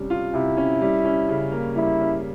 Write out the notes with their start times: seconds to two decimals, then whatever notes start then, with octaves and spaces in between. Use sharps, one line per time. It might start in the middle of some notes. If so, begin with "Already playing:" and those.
Already playing: C3 G3 C#4
0.10 F4
0.33 C3 E4
0.57 C#4
0.81 G3
1.05 C#4
1.29 C#3
1.52 A#3
1.76 G3 E4
2.00 C#4